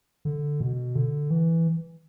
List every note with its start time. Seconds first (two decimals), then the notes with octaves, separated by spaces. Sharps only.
0.25 D3
0.61 B2
0.95 D3
1.30 E3